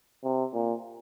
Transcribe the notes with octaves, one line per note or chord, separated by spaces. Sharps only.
C3
A#2